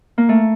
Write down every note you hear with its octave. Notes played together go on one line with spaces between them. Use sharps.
A#3
A3